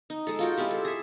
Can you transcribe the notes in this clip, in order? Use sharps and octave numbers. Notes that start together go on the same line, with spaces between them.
D#4
G#3 A4
F4 F#4 G5
G#3 C4 E4 G4
A4
G#4 E5